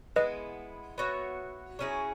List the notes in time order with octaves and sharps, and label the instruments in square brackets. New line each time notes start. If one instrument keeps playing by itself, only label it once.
[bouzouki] G#3 B3 E4 [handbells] B4 D#5
[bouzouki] B3 F#4 C#5 E5
F#3 C#4 E4 G#4